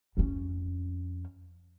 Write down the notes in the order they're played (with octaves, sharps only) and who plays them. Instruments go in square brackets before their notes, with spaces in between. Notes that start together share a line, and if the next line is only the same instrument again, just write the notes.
[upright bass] F2 C#4